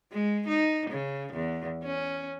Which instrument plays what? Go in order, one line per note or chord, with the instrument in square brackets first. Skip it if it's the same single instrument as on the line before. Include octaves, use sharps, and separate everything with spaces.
[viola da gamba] G#3
D#4
C#3
E2
C#4